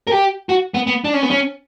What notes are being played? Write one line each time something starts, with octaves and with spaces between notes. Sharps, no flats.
A#4
G4
F#4
B3
B3
D4
C#4
B3
C#4